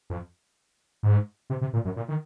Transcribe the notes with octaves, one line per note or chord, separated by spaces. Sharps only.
F2
G#2
C3
C3
A#2
F#2
A#2
D#3